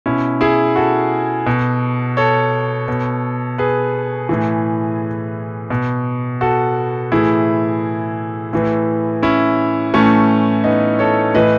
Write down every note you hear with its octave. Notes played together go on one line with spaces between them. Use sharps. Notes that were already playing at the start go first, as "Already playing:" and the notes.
B2 C#4 E4
E4 G#4
F#4 A4
B2
A4 C#5
B2
G#4 B4
A2 E3
B2
F#4 A4
A2 E3 E4 G#4
A2 E3
C#4 E4
A2 E3 A3 C#4
B3 D#4
A4 C#5
A2 E3 B4 D#5